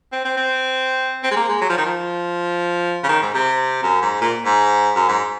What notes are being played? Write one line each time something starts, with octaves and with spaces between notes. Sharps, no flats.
C4
C4
C4
C4
G#3
A#3
G#3
F#3
F3
D#3
F3
C#3
D#3
G#2
C3
F#2
G#2
A#2
G#2
F#2
G#2